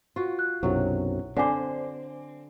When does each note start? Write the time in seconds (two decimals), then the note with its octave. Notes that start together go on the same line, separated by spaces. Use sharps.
0.16 F4 F#4
0.39 F#6
0.63 B1 F#2 C3 F#3 E4
1.37 D3 C4 C5 D5 G#5 D6